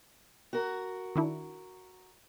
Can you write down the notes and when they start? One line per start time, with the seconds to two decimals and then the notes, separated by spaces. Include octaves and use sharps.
0.53 F#4 A#4
1.16 D#3 D4 E4